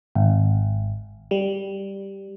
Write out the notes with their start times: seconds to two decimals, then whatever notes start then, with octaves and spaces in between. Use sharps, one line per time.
0.15 G#1
1.31 G3